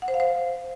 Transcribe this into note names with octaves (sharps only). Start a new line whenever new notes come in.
F#5
C5
F5
C5